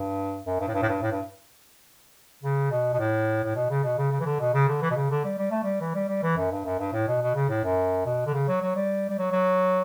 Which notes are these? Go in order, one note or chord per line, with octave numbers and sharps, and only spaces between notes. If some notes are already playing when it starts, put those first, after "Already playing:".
Already playing: G2
F#2
G2
A2
G2
A2
G2
A2
G2
C#3
B2
B2
A2
A2
B2
C#3
B2
C#3
C#3
E3
D3
B2
C#3
D3
E3
B2
C#3
D3
G3
G3
A3
G3
E3
G3
G3
E3
F#2
G2
F#2
G2
A2
B2
B2
C#3
A2
F#2
B2
D3
C#3
F#3
F#3
G3
G3
F#3
F#3